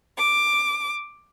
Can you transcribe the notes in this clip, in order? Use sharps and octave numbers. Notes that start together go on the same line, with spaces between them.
D6